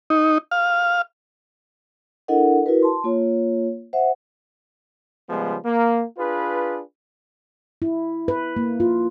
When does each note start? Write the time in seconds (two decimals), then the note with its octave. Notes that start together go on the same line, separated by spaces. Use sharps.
0.10 D#4
0.51 F5
2.28 D4 E4 A4 A#4 D#5 F#5
2.66 E4 F#4 A#4 B4
2.82 A5 C6
3.04 A#3 F4 C#5
3.93 C5 E5 F#5
5.29 C#3 F3 G3 G#3 B3
5.65 A#3
6.18 D4 F4 G#4 B4
7.82 E4
8.28 B4
8.57 A#3
8.80 F4